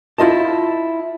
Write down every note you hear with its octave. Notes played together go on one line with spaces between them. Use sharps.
E4 F4 D#5 A5